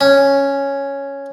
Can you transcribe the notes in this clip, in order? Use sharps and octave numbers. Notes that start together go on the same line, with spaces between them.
C#4